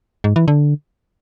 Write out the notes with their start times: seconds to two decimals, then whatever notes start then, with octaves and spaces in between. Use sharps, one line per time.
0.24 G#2
0.36 E3
0.48 D3